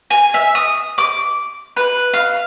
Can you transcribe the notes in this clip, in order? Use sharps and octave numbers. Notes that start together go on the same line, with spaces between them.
G#5
E5
D#6
D6
B4
F5